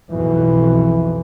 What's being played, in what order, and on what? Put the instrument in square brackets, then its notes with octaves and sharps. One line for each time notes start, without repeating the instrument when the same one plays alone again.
[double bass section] B1 F2 B2 [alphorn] E3